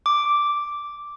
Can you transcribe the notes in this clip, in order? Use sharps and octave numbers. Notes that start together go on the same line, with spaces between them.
D6